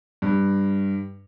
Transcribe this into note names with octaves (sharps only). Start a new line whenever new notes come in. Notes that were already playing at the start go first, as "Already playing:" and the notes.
G2